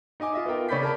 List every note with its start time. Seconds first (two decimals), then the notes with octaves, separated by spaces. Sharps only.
0.20 D#4 D#5 G#5 D6
0.33 F4 D#5 E5
0.46 B3 F4 A#4 G5
0.69 C#3 C#4 D5 B5 G6 B6
0.83 A#4 A5 B5